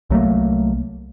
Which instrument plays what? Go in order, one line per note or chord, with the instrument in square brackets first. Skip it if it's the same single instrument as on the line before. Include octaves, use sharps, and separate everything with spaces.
[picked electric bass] C2 F#3 A3 A#3